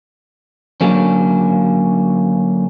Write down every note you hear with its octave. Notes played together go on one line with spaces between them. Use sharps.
D3 F#3 A#3 C#4